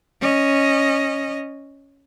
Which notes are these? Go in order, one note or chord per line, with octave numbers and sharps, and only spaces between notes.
C#4 D#5